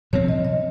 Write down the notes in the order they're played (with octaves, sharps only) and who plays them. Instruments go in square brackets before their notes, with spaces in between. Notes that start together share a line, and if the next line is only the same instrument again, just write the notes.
[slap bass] C3 F3 C4 [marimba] C#5
[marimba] D#5
D#5